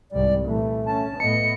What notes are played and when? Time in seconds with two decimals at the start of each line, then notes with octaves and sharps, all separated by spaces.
0.12 C2 G#2 G3 D5
0.45 A#2 E3 A3
0.86 C#4 A5
1.20 A2 A3 B3 D#5 C#7